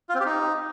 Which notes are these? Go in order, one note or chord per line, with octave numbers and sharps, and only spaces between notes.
F4
C4
G4
D#4